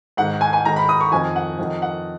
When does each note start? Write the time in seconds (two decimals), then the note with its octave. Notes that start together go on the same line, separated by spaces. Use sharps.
0.17 G#2 D#3 F#5
0.41 G#5
0.53 G#5
0.65 G#2 D#3 A#5
0.76 B5
0.89 D#6
1.01 C#6
1.11 F2 D#3 G#5
1.36 F#5
1.59 F2 D#3
1.82 F#5